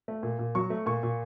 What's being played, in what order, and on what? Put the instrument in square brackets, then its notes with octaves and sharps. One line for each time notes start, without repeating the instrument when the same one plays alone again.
[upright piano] A3
A#2
A#2
F#3 C#6
A3
A#2 C#6
A#2